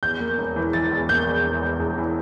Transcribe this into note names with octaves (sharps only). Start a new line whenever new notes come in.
E2 G6
A#3
E1
E3
E3 A6
E2
A#3 G6
E2
E1
E2
E1
E3